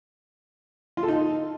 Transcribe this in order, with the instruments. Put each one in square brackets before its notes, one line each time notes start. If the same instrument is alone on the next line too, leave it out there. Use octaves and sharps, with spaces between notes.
[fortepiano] F4
A4
D#4